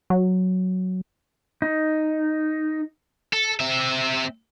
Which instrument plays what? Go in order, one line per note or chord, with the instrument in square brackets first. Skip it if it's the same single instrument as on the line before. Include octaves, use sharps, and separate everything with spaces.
[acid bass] F#3
[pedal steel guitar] D#4
[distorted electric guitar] A4
C4 E5